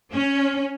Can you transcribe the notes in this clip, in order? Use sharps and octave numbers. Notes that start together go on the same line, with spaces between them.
C#4